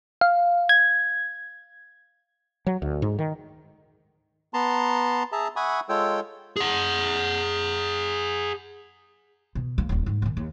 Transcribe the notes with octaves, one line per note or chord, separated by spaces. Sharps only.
F5
G#6
F#3
D2
G#2
D#3
B3 A5 A#5 C6
G#4 E5 A5 A#5
E5 F#5 G#5 B5 C#6 D#6
G#3 F4 A4 C#5 G5 E6
G#4 F#5
B2
A#1 A#3
D#1 C#4
G#2
A#2 D#3
D#2